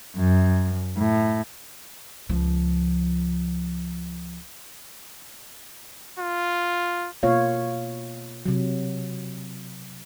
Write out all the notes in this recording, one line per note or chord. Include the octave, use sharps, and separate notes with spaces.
F#2
A2
C#2 F3
F4
B2 A#3 F4 C#5 F5
C3 F#3